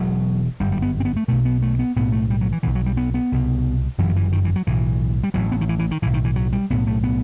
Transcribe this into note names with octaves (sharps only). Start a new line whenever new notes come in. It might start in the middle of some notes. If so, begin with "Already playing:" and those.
Already playing: E1 E2 B2 F#3
G1 G3
F#2
G3
B3
C4
B3
A3
B1 B2 A3
B3
A3
B3
B1 A2 B3
A3
G3
F#3
E3
B1 B2 E3
F#3
G3
B3
B3
C2 B2
G1 F#2 E3
F#3
E3
D#3
E3
F#3
B1 A2 E3
G3
A1 A2 F#3
B3
D#3
E3
E3
D#3
B1 A2 E3
D#3
E3
F#3
G3
B1 A2 B3
A3
B3